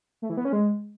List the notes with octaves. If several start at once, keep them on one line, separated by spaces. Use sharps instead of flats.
A3
E3
B3
C#4
G#3